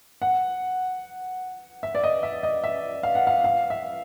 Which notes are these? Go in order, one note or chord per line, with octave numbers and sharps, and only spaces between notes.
F#5
E5
D5
D#5
E5
D#5
E5
F5
F#5
F5
F5
E5